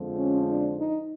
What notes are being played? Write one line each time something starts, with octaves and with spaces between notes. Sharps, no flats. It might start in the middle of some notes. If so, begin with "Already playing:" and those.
Already playing: F2 D3 F3 G#3
C#4
D4
D#4